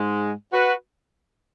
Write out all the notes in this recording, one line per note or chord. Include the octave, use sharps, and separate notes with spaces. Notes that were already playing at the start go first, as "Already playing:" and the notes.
Already playing: G#2 G#3
F#4 B4